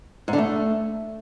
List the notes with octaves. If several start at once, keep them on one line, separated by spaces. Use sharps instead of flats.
G#2
D3
A3